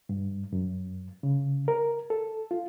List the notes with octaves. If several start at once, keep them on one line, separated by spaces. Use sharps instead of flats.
G2
F#2
C#3
A#4
A4
F4